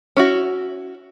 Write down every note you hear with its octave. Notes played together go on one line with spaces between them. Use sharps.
C#4 E4 F#4